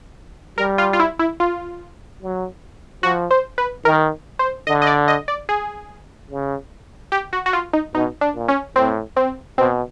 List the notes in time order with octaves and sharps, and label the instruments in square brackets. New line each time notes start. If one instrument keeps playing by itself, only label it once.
[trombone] G3 [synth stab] A#4
[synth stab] F4
F4
E4
E4
F4
[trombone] F#3
[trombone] F3 [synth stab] F#4
[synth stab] C5
B4
[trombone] D#3 [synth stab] A#4
[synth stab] C5
[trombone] D3 [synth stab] D#5
[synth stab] D#5
D5
D#5
D5
G#4
[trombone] C#3
[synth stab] G4
F#4
F#4
F4
D#4
[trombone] B2 [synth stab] D#4
[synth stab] D4
[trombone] A#2
[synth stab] C#4
[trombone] A2 [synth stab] C4
[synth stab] C4
[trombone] B2 [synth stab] C4